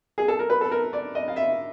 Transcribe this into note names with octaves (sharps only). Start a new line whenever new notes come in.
G#4
A4
A#4
B4
A4
A#4
D5
D#5
F5
E5